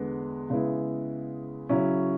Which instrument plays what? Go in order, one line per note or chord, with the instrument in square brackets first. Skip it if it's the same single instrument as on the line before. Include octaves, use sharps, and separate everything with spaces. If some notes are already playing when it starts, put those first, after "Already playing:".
Already playing: [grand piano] E2 D3 G#3 B3
C#3 G#3 B3 E4
C#3 F#3 C#4 E4